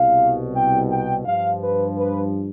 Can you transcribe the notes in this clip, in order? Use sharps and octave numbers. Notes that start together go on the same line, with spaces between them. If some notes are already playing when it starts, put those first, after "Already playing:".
Already playing: C2 B2 F5
G5
G5
G2 F3 F5
B4
B4